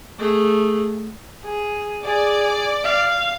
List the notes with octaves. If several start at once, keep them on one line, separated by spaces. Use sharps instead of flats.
A3 G#4
G#4
G#4 D5
F5